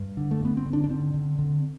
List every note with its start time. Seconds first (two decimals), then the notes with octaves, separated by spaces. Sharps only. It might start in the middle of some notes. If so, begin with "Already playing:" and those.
Already playing: G2
0.17 D3
0.31 A3
0.41 G2 B3
0.57 C4
0.66 D3
0.73 D4
0.84 D4
0.90 D3 C4
1.14 D3
1.39 D3